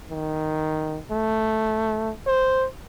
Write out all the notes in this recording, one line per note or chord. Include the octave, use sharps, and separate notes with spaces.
D#3
A3
C5